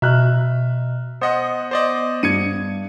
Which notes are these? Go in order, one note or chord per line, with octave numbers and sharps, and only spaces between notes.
B2 E5 A#5 F6 F#6
B3 C5 D#5 F#5
C5 D5 D#5
G2 G#6 C#7 D#7